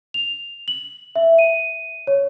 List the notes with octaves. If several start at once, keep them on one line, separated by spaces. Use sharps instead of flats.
F7
F#7
E5
D#7
C#5